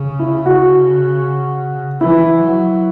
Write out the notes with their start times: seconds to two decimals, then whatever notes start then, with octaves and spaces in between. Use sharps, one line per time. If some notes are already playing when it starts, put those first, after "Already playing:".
Already playing: C#3
0.19 E4
0.46 F#4
2.01 E3 E4
2.40 F#3